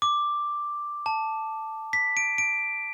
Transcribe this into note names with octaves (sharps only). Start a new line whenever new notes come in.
D6
A5
B6
D7
D7